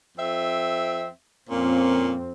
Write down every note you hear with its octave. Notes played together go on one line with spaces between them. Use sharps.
F2 C4 E5
F2 A#2 A#3 C4 C#4